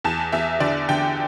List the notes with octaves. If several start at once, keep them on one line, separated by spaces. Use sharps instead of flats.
E2 A5
E2 E5
D3 D5
D3 G5